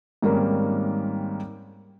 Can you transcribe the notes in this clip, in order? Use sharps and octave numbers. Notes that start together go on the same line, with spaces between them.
G#2 D#3 G3 A#3 C4 C#4